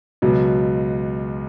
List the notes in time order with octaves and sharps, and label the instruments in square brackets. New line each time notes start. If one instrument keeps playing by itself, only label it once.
[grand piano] C#2 B2 F#3